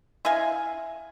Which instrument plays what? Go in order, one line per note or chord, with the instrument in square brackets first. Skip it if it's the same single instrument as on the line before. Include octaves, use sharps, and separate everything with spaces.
[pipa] E4 D#5 F5 G#5